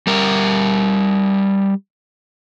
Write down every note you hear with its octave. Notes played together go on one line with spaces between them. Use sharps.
G3 A#4